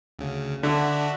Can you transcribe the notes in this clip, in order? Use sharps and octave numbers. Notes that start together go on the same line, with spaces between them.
D2 C#3
D3 D4 F#4 E5